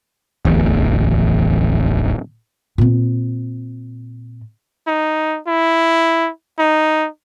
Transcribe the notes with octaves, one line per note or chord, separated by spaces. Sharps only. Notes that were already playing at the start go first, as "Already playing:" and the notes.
D1 A1 E2
A#2 C4
D#4
E4
D#4